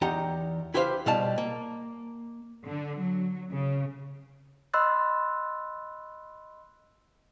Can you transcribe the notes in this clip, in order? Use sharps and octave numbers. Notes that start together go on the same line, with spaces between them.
E2 D#4 G4 F#5 A#5
E4 G4 B4 C5 F5
B2 G3 F5 A5
A#3
D3
F#3
C#3
D#5 B5 C6 E6 F#6 A6